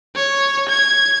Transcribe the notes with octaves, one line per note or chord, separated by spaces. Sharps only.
C#5
G#6